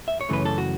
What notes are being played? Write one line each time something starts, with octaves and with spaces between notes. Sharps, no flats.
E5
C#5
F#2 C#3 E3 A3 B4
A4
F#4